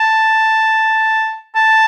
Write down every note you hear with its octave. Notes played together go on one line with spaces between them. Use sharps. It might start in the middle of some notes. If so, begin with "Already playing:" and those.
Already playing: A5
A5